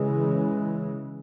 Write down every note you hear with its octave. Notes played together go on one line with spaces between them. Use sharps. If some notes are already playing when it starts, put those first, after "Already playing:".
Already playing: C#3 E3 G#3